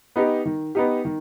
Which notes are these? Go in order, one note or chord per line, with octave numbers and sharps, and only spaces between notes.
B3 D#4 G4
D#3
B3 D#4 G4
D#3